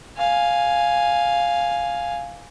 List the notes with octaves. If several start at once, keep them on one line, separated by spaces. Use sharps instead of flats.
F5 G#5